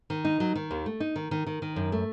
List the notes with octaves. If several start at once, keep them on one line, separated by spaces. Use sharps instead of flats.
D#3
D#4
F#3
D#3
D#2
A3
D#4
D#3
D#3
D#3
D#3
F#2
A3